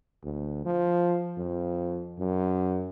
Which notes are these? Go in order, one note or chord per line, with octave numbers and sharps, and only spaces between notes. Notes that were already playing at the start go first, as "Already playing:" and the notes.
D2
F3
F2
F#2